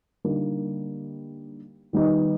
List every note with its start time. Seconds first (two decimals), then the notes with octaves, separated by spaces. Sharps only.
0.24 D3 G3 A#3 D#4
1.93 D#3 G3 B3 D#4